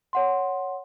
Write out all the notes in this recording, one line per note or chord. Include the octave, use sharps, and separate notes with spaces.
C#5 F#5 C6